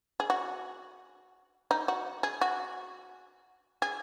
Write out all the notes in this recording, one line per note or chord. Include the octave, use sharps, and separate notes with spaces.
G#4
F#4
D#4
F#4
G#4
F#4
G#4